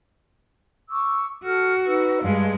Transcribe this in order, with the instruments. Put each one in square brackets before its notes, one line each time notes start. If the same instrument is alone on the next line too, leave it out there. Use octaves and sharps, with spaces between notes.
[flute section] C#6 D6 E6
[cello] F#4 [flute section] A4 F6
[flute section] D#4 B4 E6
[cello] G2 G#3 [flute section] F5